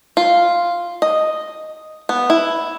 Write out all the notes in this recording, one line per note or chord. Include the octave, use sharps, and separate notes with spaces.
F4
D#5
B3
E4